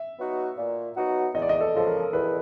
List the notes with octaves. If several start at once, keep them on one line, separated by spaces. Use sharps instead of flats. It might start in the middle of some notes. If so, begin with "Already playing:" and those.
Already playing: E5
F#3 B3 D#4 F#4
A#2
F#3 B3 D#4 F#4
E2 D#5
D5
D#5
A4
C#3 F3 A4
A#4
E2 B4